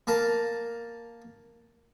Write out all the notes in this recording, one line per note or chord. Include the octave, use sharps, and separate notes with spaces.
A#3 A#4 A5 A#5